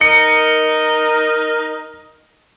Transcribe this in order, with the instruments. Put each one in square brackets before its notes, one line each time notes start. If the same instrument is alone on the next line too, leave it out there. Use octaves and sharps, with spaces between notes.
[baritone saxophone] D#4 [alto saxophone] A#4 [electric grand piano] C#7